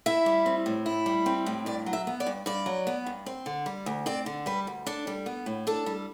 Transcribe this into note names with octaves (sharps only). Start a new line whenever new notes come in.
E4 E5
G3
C4
A2
E4
G3
C4
A2
G2 D5
F#3
E5
B3
D5
G2
G2 D5
F#3
B3
G2
C4
D3
G3
D2
C4 D5
D3
G3 B4
D2
D4 A4
G3
B3
A2
D4 A4
G3